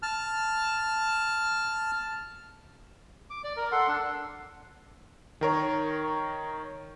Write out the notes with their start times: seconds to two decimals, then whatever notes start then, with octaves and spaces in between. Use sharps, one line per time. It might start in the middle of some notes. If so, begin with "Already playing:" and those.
0.02 A5 F6
3.30 D6
3.44 D5
3.57 A#4
3.72 A4 F#5 C6
3.88 D4
5.41 D#3 A#4 C#5